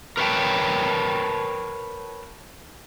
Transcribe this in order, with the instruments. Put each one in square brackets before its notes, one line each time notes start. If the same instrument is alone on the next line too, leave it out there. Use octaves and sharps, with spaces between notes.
[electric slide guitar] A#4 B4 C#5 D5 G5 A5